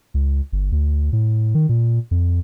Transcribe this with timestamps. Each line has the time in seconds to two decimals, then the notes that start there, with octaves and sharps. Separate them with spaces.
0.14 C#2
0.52 G1
0.72 D2
1.13 A2
1.55 D#3
1.69 A#2
2.11 F2